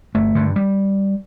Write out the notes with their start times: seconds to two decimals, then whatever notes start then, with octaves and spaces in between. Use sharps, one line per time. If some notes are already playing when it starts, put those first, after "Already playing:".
0.15 G1 A3
0.35 G2 D3
0.56 G3